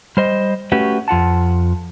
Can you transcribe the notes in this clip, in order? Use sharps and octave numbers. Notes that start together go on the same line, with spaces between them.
G3 C5 D#5
A3 C#4 F#4 G4 B4
F2 F4 F#5 A5